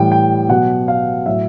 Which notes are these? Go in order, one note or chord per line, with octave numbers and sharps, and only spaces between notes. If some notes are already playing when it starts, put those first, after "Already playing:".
Already playing: A2 E3 G3 G5
G5
B2 F#3 F#5
F5
A2 F#3 E5